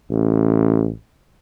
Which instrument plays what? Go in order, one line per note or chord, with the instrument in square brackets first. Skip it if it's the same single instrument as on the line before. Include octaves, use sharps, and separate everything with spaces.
[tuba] A1